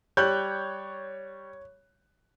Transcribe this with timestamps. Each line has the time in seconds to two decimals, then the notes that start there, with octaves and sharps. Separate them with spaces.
0.17 G3 C#5 F#6 G6